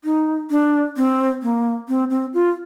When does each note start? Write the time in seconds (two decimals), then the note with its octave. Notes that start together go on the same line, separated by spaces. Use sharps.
0.04 D#4
0.50 D4
0.97 C4
1.43 A#3
1.88 C4
2.10 C4
2.34 F4